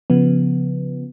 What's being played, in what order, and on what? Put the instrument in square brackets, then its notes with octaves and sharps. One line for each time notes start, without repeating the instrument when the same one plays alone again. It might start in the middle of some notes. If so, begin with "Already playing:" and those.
[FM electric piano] C#3 F3 B3